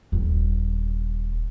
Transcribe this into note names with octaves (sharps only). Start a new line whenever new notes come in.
D#1